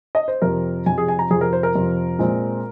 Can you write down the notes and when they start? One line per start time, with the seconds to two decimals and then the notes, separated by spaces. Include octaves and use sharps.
0.15 D#5
0.28 C5
0.42 F2 C3 F3 A#4
0.86 F2 C3 F3 G#5
0.98 G#4
1.08 G#5
1.19 A#5
1.31 F2 C3 F3 G#4
1.41 A#4
1.53 C5
1.63 A#4
1.76 F2 C3 F3
2.19 A#2 G#3 C4